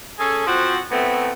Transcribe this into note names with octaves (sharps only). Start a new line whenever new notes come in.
C#4 G#4 A4
F3 C4 F#4 F#5
A2 A3 B3 C4